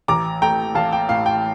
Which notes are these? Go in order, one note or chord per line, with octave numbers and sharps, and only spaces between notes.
A1 A#5 D6
A3 G5 A#5
A1 F5 A5
G5
A2 F5
G5